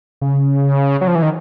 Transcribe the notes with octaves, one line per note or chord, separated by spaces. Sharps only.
C#3
F#3
F3
E3
D#3